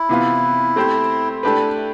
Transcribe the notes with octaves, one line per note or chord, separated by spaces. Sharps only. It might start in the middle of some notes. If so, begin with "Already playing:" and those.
Already playing: E4
C3 E3 B3 F4
A3 C4 G4 C5
A3 D4 E4 G4 B4
E4